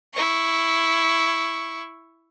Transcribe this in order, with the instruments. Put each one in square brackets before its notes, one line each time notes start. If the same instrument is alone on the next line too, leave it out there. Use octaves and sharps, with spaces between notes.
[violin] E4 C#6